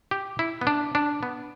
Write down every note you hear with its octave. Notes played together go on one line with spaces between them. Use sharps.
G4
E4
B3
D4
D4
B3